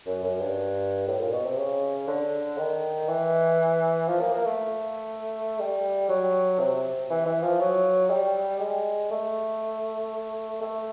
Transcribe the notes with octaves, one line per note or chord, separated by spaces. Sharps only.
F#2
F#2
G2
A2
A#2
B2
C3
C#3
D3
D#3
E3
F3
A#3
A#3
A3
G3
F#3
C3
E3
E3
F3
F#3
G3
G#3
A3
A3